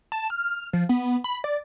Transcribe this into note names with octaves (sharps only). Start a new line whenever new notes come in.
A5
F6
F3
B3
B5
D5